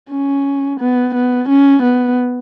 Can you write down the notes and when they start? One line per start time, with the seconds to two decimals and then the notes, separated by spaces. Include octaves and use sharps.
0.11 C#4
0.80 B3
1.15 B3
1.49 C#4
1.83 B3